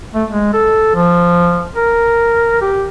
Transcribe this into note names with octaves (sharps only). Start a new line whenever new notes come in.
A3
G#3
A4
F3
A#4
G4